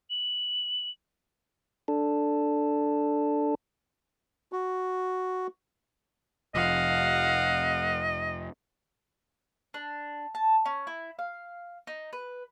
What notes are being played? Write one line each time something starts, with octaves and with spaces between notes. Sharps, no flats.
F#7
D4 A4
F#4
F1 F3 D#5 F5 F#5
D4
A5
C#4
E4
F5
D#4
B4